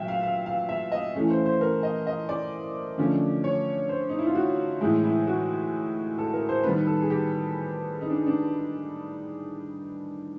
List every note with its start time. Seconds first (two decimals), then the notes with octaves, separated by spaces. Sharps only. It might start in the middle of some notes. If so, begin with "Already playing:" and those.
Already playing: A#2 F#3 E5 G5
0.08 F5
0.23 F5
0.46 F5
0.69 E5
0.92 D#5
1.14 E3 A3 C#4
1.30 C5
1.46 C5
1.61 A#4
1.83 D#5
2.07 D#5
2.29 D5
2.98 D3 F3 A3 C#4
3.44 C#5
3.89 C5
4.10 D#4
4.18 E4
4.26 F4
4.35 F#4
4.81 A2 E3 G#3 E4
5.04 E4
5.27 F#4
6.18 A4
6.33 A#4
6.49 C5
6.63 D#3 G3 B3 B4
6.87 A4
7.01 G#4
7.10 G4
8.01 D#4
8.10 D4
8.27 D4